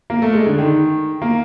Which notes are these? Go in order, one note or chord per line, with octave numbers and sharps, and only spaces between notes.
A#3
A3
G#3
D3
D#3
A#3